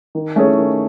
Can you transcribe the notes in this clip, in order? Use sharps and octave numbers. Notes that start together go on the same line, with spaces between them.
D#3
A3 C#4 G#4 C#5
D#3